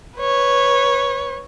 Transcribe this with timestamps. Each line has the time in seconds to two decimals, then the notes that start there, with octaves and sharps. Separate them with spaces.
0.19 B4 C#5